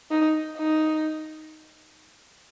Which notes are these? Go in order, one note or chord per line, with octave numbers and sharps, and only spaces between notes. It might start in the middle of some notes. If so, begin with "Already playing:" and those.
D#4
D#4